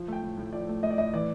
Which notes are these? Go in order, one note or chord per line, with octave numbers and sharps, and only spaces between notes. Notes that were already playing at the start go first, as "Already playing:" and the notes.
Already playing: F3
A3 G5
A2
A2
F3 D5
A3
A2 D#5
D5
A2 D#5
E3 D5